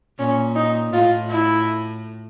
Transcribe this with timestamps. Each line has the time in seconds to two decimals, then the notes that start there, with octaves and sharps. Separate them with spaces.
0.18 A#2 C#4
0.55 D#4
0.93 A2 F4
1.30 E4